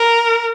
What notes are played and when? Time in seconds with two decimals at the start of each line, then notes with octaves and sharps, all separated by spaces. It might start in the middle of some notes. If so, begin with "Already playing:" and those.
Already playing: A#4